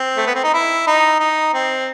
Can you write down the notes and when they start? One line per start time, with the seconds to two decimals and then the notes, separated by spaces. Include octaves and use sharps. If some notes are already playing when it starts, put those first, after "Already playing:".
Already playing: C4
0.17 A3
0.26 B3
0.35 C4
0.44 D#4
0.53 E4
0.87 D#4
1.20 D#4
1.54 C4